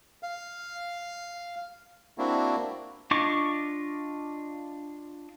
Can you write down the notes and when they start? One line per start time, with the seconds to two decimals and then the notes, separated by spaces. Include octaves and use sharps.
0.23 F5
2.18 A#3 C4 D4 E4 F#4
3.11 D4 F4 D#5 C#6 D6